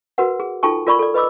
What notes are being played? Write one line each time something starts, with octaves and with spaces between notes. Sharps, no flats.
F#4 A#4 B4 F#5
G#4
D#4 F4 A4 G5 A5 C#6
F4 A#4 D5 B5 C#6
A4 D5
B4 D#5 B5 D6 E6